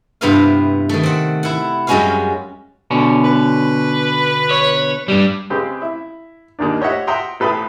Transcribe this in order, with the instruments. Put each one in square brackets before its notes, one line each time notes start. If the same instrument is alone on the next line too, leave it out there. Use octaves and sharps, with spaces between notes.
[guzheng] G2 C3 B3 E4 F4 F5
D#3 A3
C4 F#5
E4 F#5
F#2 G3 G#3 C#4 F#4 F5
[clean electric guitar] B2 D3 C#4
[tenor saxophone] B4
[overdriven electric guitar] C#5
G2 G3
[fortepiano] C#3 G#3 C4 G4 B4
E4
D#2 D#3 A#3 D4
G4 C#5 D#5 E5 F#5
E5 F#5 G5 A#5 C6 D#6
A1 A4 B4 G5 B5 D#6